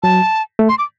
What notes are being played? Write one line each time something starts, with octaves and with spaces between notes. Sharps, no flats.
F#3 A5
A3
C6
D6